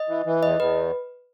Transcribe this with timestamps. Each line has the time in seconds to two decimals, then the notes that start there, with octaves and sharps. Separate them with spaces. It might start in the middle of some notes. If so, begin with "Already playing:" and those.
Already playing: D#5
0.09 E3
0.26 E3
0.43 E2 D#5
0.59 E2 B4